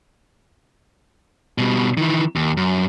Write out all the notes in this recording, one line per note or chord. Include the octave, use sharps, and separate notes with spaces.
B2 G3
D#3 E3
D#2
F#2